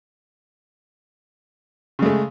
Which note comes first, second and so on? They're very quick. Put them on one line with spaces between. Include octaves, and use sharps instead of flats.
C#3 G#3 A3